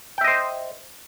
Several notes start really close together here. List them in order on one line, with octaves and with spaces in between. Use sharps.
G5 E5 D#5 C5